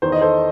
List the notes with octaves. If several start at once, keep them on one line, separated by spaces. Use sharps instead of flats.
E2 D#3 C5
D#5
A4 C5